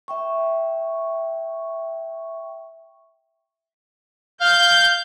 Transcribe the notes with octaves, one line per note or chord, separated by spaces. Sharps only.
E5 G5 C#6
F5 G6